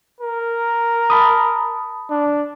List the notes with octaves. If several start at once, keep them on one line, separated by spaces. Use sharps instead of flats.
A#4
A5 B5 D#6
D4